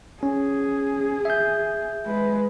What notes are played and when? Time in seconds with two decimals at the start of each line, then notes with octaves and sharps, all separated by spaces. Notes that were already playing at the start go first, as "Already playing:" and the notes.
0.23 C#4 G#4
1.25 E5 G6
2.06 G#3 B4